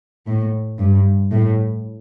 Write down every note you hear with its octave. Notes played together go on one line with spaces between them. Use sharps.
A2
G2
A2